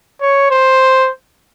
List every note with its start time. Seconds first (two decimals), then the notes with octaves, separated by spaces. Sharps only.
0.21 C#5
0.50 C5